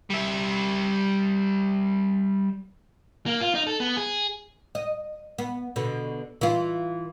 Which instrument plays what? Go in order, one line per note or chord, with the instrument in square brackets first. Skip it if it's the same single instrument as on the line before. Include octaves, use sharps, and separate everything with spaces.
[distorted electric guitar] G3 E5
[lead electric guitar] A#3
F4
D#4
A4
B3
G#4
[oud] D#5
B3
B2 D3
E3 F4